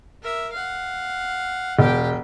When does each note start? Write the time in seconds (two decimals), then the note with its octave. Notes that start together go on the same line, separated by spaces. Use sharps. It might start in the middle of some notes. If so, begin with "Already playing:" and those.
0.22 A#4 E5
0.52 F5 F#5
1.79 E1 G4 G5